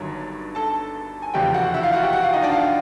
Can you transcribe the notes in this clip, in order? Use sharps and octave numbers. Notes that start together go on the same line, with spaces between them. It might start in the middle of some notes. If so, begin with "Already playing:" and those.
Already playing: G1 G2 D#3 F#3 C#5
A4 A5
G#5
F1 E2 C#3 F3 G4 G5
F#4 F#5
E4 E5
F4 F5
F#4 F#5
G4 G5
F#4 F#5
F4 F5
D#4 D#5
D4 D5
F4 F5